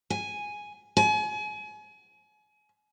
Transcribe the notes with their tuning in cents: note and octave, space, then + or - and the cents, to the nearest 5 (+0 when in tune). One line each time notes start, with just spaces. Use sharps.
G#5 +0
G#5 +35